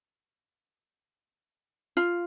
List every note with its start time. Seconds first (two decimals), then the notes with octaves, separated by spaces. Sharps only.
1.97 F4